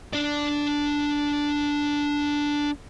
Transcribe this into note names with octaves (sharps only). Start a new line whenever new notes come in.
D4 D5